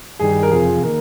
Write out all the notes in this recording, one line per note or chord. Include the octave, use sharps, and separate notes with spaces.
G2 D#3 G3 G#4
A#4
F2 C3 F3 G#4
D#3 A#3 A#4